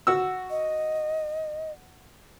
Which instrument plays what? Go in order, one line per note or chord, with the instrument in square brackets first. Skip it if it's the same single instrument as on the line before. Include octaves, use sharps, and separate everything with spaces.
[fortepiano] F#4 E6
[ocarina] D#5